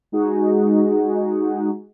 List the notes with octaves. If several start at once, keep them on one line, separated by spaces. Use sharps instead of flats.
G#3 D#4 F#4 G#4